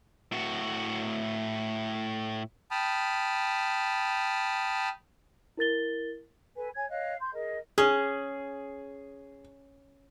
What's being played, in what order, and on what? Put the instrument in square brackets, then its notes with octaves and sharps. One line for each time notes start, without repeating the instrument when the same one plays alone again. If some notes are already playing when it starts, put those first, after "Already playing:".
[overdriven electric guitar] A2 F#4
[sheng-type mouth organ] G5 A5 B5 D#6 F6
[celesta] E4 A#4 A6 G7
[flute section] A4 B4 G#5
C#5 G#5 G#6
C#5 D#5 F5 F#6
C6 G6
G#4 A#4 D#5
[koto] C#4 [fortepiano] G#4